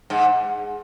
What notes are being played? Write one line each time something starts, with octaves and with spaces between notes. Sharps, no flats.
G#2